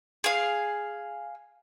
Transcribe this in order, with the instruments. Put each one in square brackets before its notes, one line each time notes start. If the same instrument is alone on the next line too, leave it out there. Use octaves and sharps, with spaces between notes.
[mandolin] G#4 F5